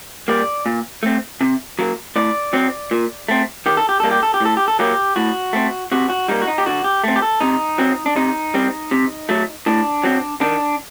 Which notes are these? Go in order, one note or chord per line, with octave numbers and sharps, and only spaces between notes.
G3 A#3 D5
A#2
A3 C4
C3
F#3 A#3
A2 D5
F#3 C4
A#2
A3 C4
D#3 G4
A4
G4
G3 A#3 A4
G4
A4
G4
A2 A4
G4
A4
F#3 A#3 G4
A2 F#4
A3 C4
C3 F#4
F#4
G3 A#3 D#4
F#4
D#4
G4
D3 F#4
G4
A3 C4
G4
A4
C3 D#4
F#3 C4
D4
C3 D#4
G3 C4
C3
F#3 A3
A2 D4
F#3 C4
D#3 D4